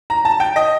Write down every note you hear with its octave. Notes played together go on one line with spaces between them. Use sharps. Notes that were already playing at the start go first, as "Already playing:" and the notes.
A#5
A5
G5
D#5